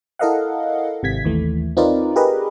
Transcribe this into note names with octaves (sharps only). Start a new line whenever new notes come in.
E4 A4 A#4 D#5 F5 F#5
G#1 C3 G#6 B6
D#2 E3 A3
C4 D#4 F4 A#4 B4 D5
G4 G#4 A#4 B4 D#5